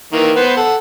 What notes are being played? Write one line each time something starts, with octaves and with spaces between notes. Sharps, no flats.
D#3 E3 A#3
B3 B4 C5
A4 F#5